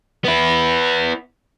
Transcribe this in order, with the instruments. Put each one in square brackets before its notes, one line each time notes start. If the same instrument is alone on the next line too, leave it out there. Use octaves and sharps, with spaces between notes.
[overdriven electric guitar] B3 E4